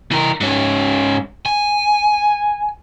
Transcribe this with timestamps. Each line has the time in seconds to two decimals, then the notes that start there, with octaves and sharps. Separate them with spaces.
0.11 E3 A#4
0.41 G#2 C#4
1.46 G#5